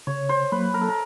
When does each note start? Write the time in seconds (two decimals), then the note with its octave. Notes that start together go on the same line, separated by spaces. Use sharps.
0.07 C#3 C#5
0.29 C5
0.52 F#3 A#3 B4
0.74 A#4
0.81 A4
0.89 A#4